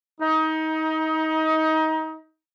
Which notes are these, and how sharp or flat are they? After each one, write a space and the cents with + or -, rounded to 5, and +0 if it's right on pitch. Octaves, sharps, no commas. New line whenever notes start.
D#4 +25